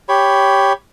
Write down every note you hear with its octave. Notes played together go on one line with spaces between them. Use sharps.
G4 C#5 B5